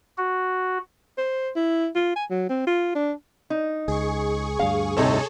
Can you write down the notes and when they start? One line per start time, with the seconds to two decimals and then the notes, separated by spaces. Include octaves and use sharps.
0.18 F#4
1.18 C5
1.55 E4
1.95 F4
2.16 G#5
2.30 F#3
2.49 C4
2.67 F4
2.95 D4
3.50 D#4
3.88 C#2 G#4 C#6
4.59 D2 G2 F5
4.97 A2 C3 D#4 G#4 A4 C#5